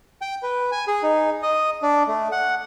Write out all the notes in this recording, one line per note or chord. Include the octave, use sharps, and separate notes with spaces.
G5
B4
G#5
G#4
D#4
D#5
D4
A3
F#5